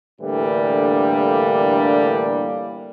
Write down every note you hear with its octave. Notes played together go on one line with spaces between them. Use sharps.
A2 D3 E3 G3 A#3 D4